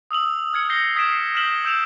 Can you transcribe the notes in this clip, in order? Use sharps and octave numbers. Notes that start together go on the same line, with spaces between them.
D#6 E6 F7 F#7
F6 G#6 C#7 F#7
G6 G#6 A#6 C7 G7
D#6 G#6 B6 C7 D7 E7
F6 G6 B6 E7 F#7 G7
E6 G6 D7 E7 F7